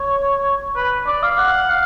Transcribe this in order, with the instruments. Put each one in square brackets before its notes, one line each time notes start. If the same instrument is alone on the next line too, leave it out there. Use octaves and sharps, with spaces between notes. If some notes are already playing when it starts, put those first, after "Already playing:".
Already playing: [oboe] C#5
B4
D5
F5
F#5
F5